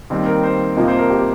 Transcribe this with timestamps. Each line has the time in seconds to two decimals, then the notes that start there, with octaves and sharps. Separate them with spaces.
0.10 D#2 D#3 G3 C4 D#4
0.26 A#4
0.43 C5
0.76 F2 C3 F3 A#3 D#5
0.88 C5
0.99 A#4
1.10 G4